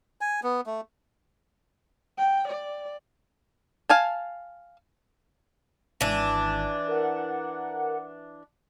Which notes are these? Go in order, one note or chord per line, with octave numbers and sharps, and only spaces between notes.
G#5
B3
A3
G5
D5
F5 G#5 A5
G#1 E3 D4
A#4 F#5